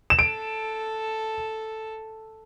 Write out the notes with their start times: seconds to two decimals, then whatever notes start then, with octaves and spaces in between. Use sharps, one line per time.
0.10 E7
0.18 A4 D7